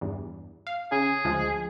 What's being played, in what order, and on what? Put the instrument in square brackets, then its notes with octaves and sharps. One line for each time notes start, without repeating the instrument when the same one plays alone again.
[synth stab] E2 G2
F5
[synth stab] C#3 [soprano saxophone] G#4
[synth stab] D2 F3 G#3